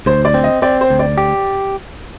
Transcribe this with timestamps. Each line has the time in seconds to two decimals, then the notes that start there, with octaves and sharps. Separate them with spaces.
0.06 D2 C5
0.25 D5
0.34 C4
0.44 D#5
0.62 C4 D5
0.81 C5
0.90 D2
0.99 D5
1.18 G4